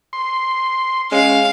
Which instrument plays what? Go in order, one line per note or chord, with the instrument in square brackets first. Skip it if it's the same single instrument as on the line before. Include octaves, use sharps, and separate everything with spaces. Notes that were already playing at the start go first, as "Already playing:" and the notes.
[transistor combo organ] C6
[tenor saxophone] G#3 [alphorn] C#4 [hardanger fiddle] F5